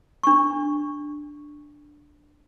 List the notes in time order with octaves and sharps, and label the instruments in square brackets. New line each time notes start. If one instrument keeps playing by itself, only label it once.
[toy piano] D4 C#6